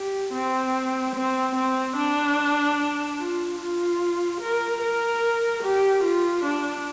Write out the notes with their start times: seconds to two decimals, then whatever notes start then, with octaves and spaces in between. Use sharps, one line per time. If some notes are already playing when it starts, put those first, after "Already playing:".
Already playing: G4
0.34 C4
1.16 C4
1.55 C4
1.97 D4
3.19 F4
3.59 F4
4.41 A#4
4.81 A#4
5.63 G4
6.04 F4
6.44 D4